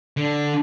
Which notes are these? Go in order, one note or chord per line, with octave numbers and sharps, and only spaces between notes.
D3